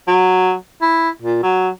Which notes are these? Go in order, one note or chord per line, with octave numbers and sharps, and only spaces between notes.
F#3
E4
A#2
F#3